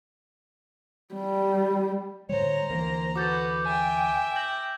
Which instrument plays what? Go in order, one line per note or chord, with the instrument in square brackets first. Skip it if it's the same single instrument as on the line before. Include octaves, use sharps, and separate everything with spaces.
[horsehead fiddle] G3
[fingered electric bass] A2 D3 G3 [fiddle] C5 A#5 [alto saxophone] C#5
[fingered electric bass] D2 E3 [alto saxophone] A#3
[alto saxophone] F#4 [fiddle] A4 B4 [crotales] D6 G6 A6
[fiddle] E5 G5 [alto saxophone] G#5
[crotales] G6 A#6 F#7